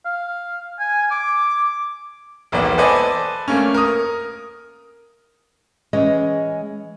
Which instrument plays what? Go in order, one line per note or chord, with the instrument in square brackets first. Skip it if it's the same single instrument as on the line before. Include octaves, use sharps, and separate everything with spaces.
[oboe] F5
G#5
D6
[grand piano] E1 B1 A#3 B3 D5
A4 B4 C5 D5 D#5 G#5
A3 A#3 C#4
A#4 D#6
[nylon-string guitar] E3 G#3 C#4 D#5